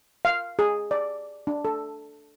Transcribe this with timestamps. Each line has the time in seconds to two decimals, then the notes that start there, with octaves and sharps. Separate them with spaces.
0.25 F5
0.59 G#4
0.91 D5
1.47 D4
1.65 A4